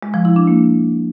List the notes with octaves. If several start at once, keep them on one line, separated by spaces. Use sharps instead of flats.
G#3
F3
E4
D4
A#3